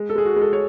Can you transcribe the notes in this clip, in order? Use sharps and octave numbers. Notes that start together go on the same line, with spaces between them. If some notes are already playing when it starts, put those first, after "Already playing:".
Already playing: G#3
A4
G#3 G#4
F#4
G#3
A4
C#5